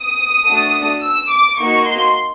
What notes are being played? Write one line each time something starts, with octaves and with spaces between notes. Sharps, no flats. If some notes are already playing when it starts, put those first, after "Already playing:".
Already playing: D#6
A3 D4 F#4 A4
E6
D6
A#3 D#4 F#4 C#6
C6